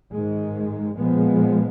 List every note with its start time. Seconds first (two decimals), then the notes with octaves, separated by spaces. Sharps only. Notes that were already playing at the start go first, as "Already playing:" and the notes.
0.11 G#2 D#3 G#3
0.97 A#2 F3 G#3 B3